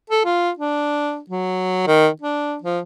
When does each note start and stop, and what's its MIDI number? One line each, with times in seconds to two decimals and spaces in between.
0.10 0.23 69
0.25 0.50 65
0.59 1.19 62
1.30 1.85 54
1.87 2.08 51
2.22 2.56 62
2.62 2.79 53